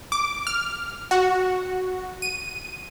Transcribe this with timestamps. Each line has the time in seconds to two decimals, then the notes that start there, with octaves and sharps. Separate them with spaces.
0.12 D6
0.47 F6
1.11 F#4
2.22 D#7